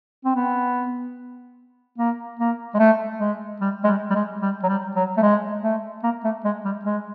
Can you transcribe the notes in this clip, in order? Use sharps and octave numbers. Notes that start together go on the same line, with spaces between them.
C4
B3
A#3
A#3
G#3
A3
G#3
G3
G#3
G3
G3
G#3
G3
F#3
G3
F#3
A3
G#3
A3
A#3
A3
G#3
G3
G#3